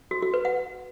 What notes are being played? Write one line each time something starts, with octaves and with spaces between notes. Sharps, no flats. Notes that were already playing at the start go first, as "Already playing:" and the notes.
F#4
F#4
B4
F#5